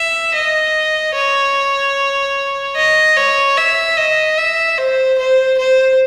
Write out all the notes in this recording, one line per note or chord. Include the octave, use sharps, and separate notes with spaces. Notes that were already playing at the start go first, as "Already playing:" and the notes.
Already playing: E5
D#5
C#5
D#5
C#5
E5
D#5
E5
C5
C5
C5